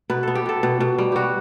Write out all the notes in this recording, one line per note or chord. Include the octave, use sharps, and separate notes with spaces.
B2 B4
B3 A4
G4
B2 A4
B2
B2
G3
G3 F#4 G4